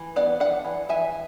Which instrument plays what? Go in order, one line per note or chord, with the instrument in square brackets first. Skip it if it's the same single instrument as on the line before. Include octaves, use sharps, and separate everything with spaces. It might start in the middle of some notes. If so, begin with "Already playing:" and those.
Already playing: [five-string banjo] E3
B3 D5 F#5
D4 D5 F#5
E3
E3 E5 G#5